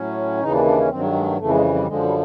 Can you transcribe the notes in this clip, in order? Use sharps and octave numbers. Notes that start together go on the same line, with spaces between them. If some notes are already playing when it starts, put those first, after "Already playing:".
Already playing: A2 F#3 C#4
D#2 C#3 E3 D#4
D4
D4
C#4
G2 D#3 F#3 C4
G#3
G#3
A3
F2 C#3 E3 A3
G#3
G3
G3
F#2 D3 F3 G#3
G3